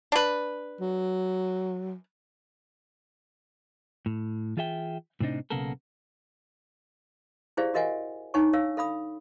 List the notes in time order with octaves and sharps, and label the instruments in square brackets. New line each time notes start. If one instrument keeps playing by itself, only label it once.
[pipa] D4 B4
[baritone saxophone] F#3
[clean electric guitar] A2
E3 F4 G#4 E5 G5
A2 C3 C4 D4 D#4
B1 C#3 A#3 B3 A4 A#4
[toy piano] E4 G4 G#4 C5 D5 F5
F#4 A#4 D#5 F5 F#5 G#5
D4 D#4 C#5 F#5 G#5 C#6
C#5 F5 E6
A4 F5 B5 D#6